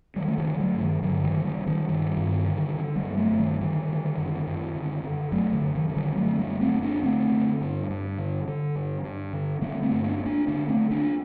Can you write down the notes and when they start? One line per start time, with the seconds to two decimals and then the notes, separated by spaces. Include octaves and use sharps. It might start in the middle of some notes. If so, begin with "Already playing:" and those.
0.16 D3 D#3 G3
0.28 A3
0.38 D#3 G3
0.46 D3
0.60 F#3 A3
0.74 G2
0.81 D#3
1.02 G2 D3 F#3
1.24 D#3 G3
1.32 D3
1.45 D#3 G3
1.59 D3
1.67 D#3 G3
1.88 G2 D#3 G3
2.17 G2
2.45 D3
2.74 D3
2.96 G3 A#3
3.03 G2
3.17 F#3 A3
3.31 G2
3.39 D#3 G3
3.61 D3 D#3 G3
3.89 D3
4.17 F#2
4.47 F#2
4.75 D3
5.03 D3
5.32 F#2 F#3 A3
5.53 D3
5.61 F#2
5.76 D#3
5.90 D3
5.97 D#3 G3
6.17 D3 F#3 A3
6.39 G3 A#3
6.47 F#2
6.61 A3 C4
6.75 F#2
6.82 A#3 D4
7.03 D3 A3 C4
7.32 D3
7.61 G2
7.90 G2
8.18 D3
8.48 D3
8.75 G2
9.04 G2
9.33 D3
9.61 D3 G3 A#3
9.83 A3 C4
9.91 G2
10.04 A#3 D4
10.19 G2
10.26 A#3 D4
10.48 D3 A#3 D4
10.69 A3 C4
10.76 D3
10.91 A#3 D4